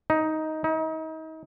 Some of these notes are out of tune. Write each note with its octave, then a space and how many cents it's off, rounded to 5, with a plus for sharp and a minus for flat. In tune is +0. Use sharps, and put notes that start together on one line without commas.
D#4 +10
D#4 +35